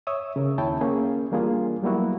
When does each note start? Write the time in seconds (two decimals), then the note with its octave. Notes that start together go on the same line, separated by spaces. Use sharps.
0.07 C#5 E5 D#6 E6
0.36 C#3 A#4
0.58 D#2 C#4 E4 C#5 G5 A5
0.81 A#3 C#4 G#4
1.31 E3 G3 A#3 D4 F4 G#4
1.83 F#3 G3 A#3 B3 E4 F#4